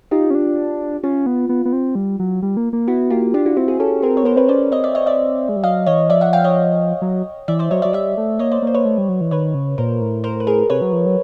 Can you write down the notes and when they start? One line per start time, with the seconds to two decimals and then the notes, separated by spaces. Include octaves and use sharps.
0.11 D#4 F4 G4
0.30 C#4
0.35 D4
1.03 C#4 F4
1.26 B3
1.49 B3
1.65 B3
1.73 C4
1.95 G3
2.19 F#3
2.43 G3
2.57 A#3
2.73 A#3
2.88 B3 E4 F#4
3.10 A#3 F4 G4
3.34 D4 F4 G4
3.46 E4 F#4
3.57 C4 E4 F#4
3.68 F#4 G#4
3.80 C#4 G4 A4
4.02 C4 G#4 A#4
4.17 C#5
4.24 B3 A#4 C5
4.36 C4 B4 C#5
4.48 C#4 C5 D5
4.72 C4 C#5 D#5
4.84 D5 E5
4.95 C#5 D#5
5.06 D5 E5
5.49 G#3
5.56 G3
5.64 F#3 D#5 F5
5.86 E3 C#5 D#5
6.10 F3 D5 E5
6.21 E5 F#5
6.33 F5 G5
6.44 C#5 D#5
7.02 F#3
7.48 E3 D5 E5
7.59 C5 D5
7.71 F#3 C#5 D#5
7.82 D5 E5
7.85 F#3
7.93 G3 D5 E5
8.18 A3
8.39 A#3 C#5 D#5
8.52 C5 D5
8.62 A#3 C5
8.75 B4 C#5
8.85 A3
8.98 G3
9.09 F#3
9.21 E3
9.31 D#3 B4 C#5
9.54 C#3
9.78 A#2 A#4 C5
10.01 A2
10.24 A#4 C5
10.40 B4
10.47 G#4 A#4
10.70 C3 B4 C#5
10.81 F#3
10.93 F3
11.06 F#3